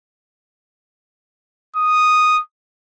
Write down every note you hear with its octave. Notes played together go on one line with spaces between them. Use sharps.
D#6